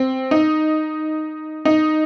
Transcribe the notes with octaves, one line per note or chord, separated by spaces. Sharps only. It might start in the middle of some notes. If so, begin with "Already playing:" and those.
Already playing: C4
D#4
D#4